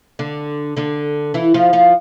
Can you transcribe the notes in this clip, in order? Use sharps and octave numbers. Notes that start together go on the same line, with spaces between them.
D3 D4
D3 D4
E3 E4
F3 F4
F3 F4